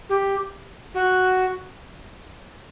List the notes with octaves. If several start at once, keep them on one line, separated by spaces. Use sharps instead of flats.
G4
F#4